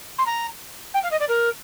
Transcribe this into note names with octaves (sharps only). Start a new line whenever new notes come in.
C6
A#5
G5
F5
D#5
D5
A#4